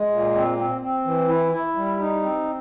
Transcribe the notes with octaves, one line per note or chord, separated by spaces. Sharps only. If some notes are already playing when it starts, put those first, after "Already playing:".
Already playing: G#3
A#2
C4
C4
C4
E3
E4
E4
G3
D#4
C4